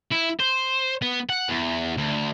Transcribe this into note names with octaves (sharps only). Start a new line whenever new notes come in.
E4
C5
B3
F#5
E2
D2